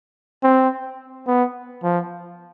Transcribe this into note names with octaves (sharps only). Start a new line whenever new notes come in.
C4
B3
F3